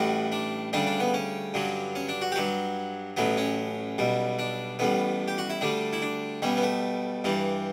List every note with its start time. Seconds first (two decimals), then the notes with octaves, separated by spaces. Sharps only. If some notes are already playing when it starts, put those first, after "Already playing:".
Already playing: A1 A2 G3 F#4
0.32 D4
0.73 D2 C#3 G3 D4
0.86 D4
1.00 B3
1.14 C#4
1.54 G2 D3 F#3
1.95 C#4
2.09 D4
2.21 F#4
2.32 G4
2.35 G2 F#3 F#4
3.17 A1 A2 F#3 B3
3.37 C#4
3.98 B1 B2 G3
4.39 D4
4.79 A1 A2 G3 B3
5.28 G4
5.38 F#4
5.50 E4
5.61 D2 D3 G3 D4
5.93 E4
6.02 D4
6.42 B1 B2 G3 C#4
6.57 B3
6.63 A3
7.24 G2 E3 G3